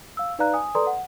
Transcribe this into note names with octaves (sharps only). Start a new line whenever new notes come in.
F5 E6
D#4 B4 D5 F5 A#5 F#6
G#5 D#6
A4 B4 D5 A#5 C6 D#6
F#5